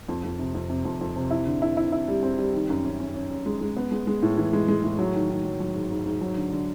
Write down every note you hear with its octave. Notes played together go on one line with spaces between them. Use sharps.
F2
F2
C3
F2
C3
F2
F2
C3
E4
D3
E4
E4
E4
G3
C4
G3
D#3
F#2
C#4
C#4
C#4
C#4
G#3
G#3
B3
G#3
G#3
A2
E3
G#3
G#3
A2
F#3
D#3
D#3
F#3
F#3
G#2
G#2
G#2
F#3
D3
D3